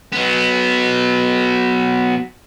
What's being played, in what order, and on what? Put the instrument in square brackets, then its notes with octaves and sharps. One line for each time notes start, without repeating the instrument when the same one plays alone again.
[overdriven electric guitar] F#3 B3